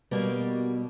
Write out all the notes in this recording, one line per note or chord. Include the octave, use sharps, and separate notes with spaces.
B2 G3 A#3